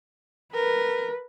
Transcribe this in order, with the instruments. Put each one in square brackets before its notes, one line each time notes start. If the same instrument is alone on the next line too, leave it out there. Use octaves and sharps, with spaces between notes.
[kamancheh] A#4 [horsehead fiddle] B4